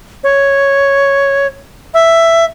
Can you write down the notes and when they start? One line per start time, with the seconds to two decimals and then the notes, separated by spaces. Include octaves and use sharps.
0.24 C#5
1.94 E5